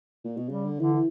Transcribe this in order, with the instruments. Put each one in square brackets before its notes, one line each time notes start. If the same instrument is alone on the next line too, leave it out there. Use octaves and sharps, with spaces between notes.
[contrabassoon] A#2
B2
[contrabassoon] C#3 [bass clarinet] G3
[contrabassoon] D3
[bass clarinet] D3 [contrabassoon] E3
[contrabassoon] E3